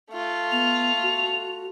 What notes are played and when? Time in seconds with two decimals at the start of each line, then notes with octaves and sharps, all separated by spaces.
0.12 A3 F4
0.51 B3 F7
1.02 F#4